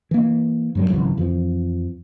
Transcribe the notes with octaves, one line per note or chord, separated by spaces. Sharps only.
E3 A#3
G2 F#3 G3
G#1 C#2 E3 F#3
F2 E3 F3